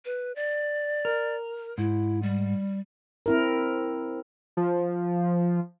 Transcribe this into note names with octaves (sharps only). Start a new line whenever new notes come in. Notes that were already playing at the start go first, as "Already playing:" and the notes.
B4
D5
A#4
G#2 E4
G3
C4 E4 A#4
F3